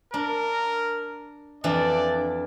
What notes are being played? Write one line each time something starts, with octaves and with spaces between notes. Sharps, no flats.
D4 A#4
F2 E3 D4 D5